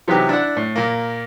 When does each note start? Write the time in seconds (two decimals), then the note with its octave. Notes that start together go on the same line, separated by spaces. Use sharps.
0.08 C3 E3 F#3 B3 D#4 G4
0.29 D4 E4 D5 F#5
0.57 A2
0.76 A#2 A#3